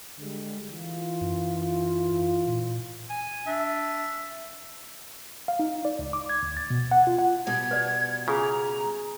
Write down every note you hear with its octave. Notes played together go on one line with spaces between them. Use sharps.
D3 G3 G#3
E3 F4
F#2
A#2
G#5
D4 E5
F5
D#4
D5
C#2
D6
G#6
D2
A6
B2
F#5
F4
F#5
B2 G3 G#6
B4 D5
C#3 F4 G#4 A#5